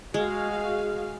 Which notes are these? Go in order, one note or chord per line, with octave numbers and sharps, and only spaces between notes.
G#3 F#4 G#4 F5